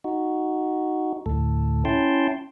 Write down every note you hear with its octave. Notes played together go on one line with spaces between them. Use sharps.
D#4 F#4
D2 A2 A4
C#4 E4 G5 A5 C6